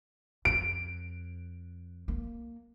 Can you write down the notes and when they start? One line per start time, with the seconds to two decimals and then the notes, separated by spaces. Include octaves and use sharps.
0.45 F2 D7
2.08 A#3